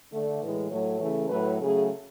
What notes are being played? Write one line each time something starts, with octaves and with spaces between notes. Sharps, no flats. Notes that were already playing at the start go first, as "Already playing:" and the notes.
D3 A3
A2 E3 G#3 B4
A2 F#3 A3 C#5
C#3 E3 A3
A2 F#3 A3 B4
C#3 F#3 A3 G#4